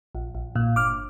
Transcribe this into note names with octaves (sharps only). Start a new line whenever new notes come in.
A#1
A#1
A#2
G1 D6 F6